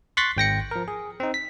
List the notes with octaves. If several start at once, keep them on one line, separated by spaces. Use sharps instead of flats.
C6 C#6 F#6 A6 B6
G#1 G5 A#6 C#7
F3 A#4
G#4
C4 D#4
B6